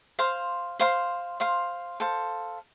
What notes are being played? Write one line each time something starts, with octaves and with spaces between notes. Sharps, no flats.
C5 F5 C6
C5 F5 C6
C5 F5 C6
A4 C5 F5